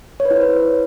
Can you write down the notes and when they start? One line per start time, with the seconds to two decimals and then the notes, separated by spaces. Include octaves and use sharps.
0.20 C#5
0.25 B4
0.31 E4
0.36 C5
0.41 B4